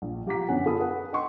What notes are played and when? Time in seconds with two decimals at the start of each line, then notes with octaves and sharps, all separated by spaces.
0.02 A#1
0.26 F3 G4 F#5 A#5 D6 B6
0.48 F#2 D3 B3 C#5 F#5 G#5
0.66 F4 A4 F5 B5 D#6
0.80 B4 F#5
1.13 D#5 F#5 G5 C6 C#6 D#6